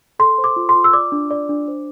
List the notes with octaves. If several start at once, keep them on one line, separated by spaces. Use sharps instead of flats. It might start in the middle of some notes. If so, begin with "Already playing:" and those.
A4 C6
C5
D6
F4
C6
F4
E6
D5 D6
D4
D5
D4
C5